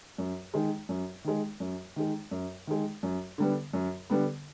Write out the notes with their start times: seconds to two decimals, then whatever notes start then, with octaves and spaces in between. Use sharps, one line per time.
0.18 F#2
0.54 D#3 G#3
0.89 F#2
1.24 D#3 G#3
1.60 F#2
1.96 D#3 G#3
2.31 F#2
2.67 D#3 G#3
3.03 F#2
3.38 D3 G3 B3
3.73 F#2
4.10 D3 G3 B3